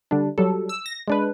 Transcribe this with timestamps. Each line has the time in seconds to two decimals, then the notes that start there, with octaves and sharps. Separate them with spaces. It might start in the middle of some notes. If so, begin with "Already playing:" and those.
0.11 D3 G3 D4
0.38 F#3 G3 A4
0.69 E6
0.86 A#6
1.08 G#3 D4 B4